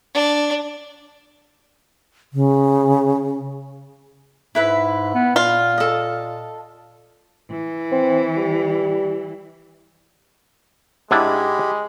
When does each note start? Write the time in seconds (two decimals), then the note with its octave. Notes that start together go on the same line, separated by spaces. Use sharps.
0.14 D4
2.33 C#3
4.55 G#2 E4 B4 E5
5.14 B3
5.36 A#2 F4
5.78 A4 D#5
7.50 E3
7.92 C4
8.37 G3
11.11 G#2 G#3 D4 E4 G4 B5